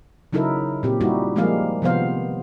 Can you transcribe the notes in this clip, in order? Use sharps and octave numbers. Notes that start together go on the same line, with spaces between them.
C#3 F#3 D#4 E4 A4 A#4
A#2 C4 G4
G3 D#4 E4 F#4 G4
F3 G3 G#3 A#3 G#4 F5
C3 D#3 F3 B3 C5 F5